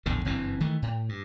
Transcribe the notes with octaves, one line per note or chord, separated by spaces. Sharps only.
A#1 E2 A2 D3
F#1 G2 E3 C4
D#3 E3 A3
A2
G2